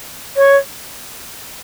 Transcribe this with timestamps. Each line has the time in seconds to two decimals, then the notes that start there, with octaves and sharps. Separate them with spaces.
0.36 C#5